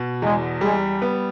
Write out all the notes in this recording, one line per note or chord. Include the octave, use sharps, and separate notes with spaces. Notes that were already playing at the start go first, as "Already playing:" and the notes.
Already playing: B2
E2 G#3
G3 G#3
B3